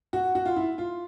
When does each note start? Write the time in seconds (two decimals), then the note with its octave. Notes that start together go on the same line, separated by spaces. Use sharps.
0.13 F#4
0.35 F#4
0.45 F4
0.56 E4
0.78 F4